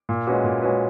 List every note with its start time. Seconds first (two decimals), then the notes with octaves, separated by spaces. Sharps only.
0.09 A#2
0.27 G#3 C#4 F#4 B4
0.44 A#2
0.62 G#3 C#4 F#4 B4